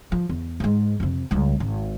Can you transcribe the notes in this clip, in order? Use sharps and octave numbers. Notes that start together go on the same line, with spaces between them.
F3
E2
G#2 G#3
F2 C3
C#2 G3
G#1